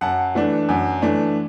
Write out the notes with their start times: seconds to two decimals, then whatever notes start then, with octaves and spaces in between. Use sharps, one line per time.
0.01 F#2 F#5 A5
0.35 E3 A3 D4
0.69 F#2
1.02 E3 A3 D4